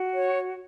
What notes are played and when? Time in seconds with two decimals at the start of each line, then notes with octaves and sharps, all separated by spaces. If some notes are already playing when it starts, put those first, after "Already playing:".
Already playing: F#4
0.14 C#5